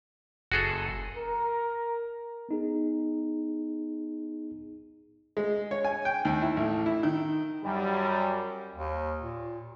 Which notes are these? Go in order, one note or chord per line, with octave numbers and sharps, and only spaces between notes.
F#1 F#4 G#4 A4
A#4
B3 D#4 G#4
G#3
C#5
G#5
G5
D#2
E4
A1
E4
D#3
F#2 G3
D#2
A#2